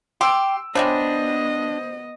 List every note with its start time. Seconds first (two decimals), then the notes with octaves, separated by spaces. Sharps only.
0.21 G4 C6 E6 D7
0.75 C#3 G3 G#3 B3 D4 C5 D#5